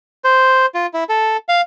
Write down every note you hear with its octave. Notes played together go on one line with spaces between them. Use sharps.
C5
F4
E4
A4
F5